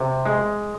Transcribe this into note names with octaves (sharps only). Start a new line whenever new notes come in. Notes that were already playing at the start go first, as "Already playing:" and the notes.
Already playing: C3
G#3